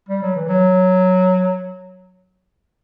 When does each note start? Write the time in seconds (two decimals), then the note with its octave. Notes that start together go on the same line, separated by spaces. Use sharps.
0.09 G3
0.22 F#3
0.35 E3
0.48 F#3